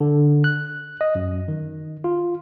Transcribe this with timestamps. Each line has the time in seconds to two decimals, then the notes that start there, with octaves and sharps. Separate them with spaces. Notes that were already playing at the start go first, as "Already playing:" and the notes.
0.01 D3
0.44 F#6
1.01 D#5
1.15 F#2
1.48 D#3
2.04 F4